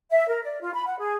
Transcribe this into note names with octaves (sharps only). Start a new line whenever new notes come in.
E5
A#4
D5
F4
B5
F#5
G#4